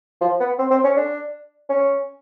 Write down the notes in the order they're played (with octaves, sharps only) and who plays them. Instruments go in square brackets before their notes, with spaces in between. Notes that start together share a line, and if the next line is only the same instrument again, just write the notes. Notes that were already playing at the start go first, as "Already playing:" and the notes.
[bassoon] F3
B3
C4
C4
C#4
D4
C#4